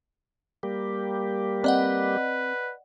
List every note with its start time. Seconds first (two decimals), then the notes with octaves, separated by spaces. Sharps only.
0.63 G3 A#3 G4
1.64 C4 B4 D5 D#5 F#5